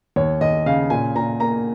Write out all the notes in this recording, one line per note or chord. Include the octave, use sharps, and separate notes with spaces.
D#2 C#5
D#2 D#5
C#3 F5
A#2 G#5
A#2 A#5
A#3 A#5